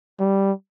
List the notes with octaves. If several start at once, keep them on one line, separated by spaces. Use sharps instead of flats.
G3